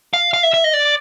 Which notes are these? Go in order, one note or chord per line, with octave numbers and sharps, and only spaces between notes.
F5
F5
E5
E5
D#5
D5